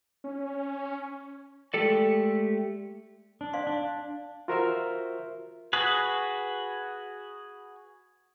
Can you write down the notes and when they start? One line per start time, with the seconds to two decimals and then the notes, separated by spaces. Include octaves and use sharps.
0.24 C#4
1.74 G#3 A3 G4 A4 D5
3.41 D4
3.53 D5 F5 C6
3.67 D4
4.48 F4 F#4 A#4 C5 E5 F6
5.73 F#4 G#4 B4